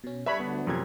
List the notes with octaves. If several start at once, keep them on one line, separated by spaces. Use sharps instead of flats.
B2 C#4
G3 D4 A4 B4 C#5 E5 B5
D2 D3 B3
F#2 C3 F3 A3 G#6